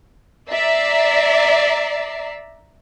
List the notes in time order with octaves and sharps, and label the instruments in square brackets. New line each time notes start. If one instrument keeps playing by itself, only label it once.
[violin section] D5 E5 A#5 C7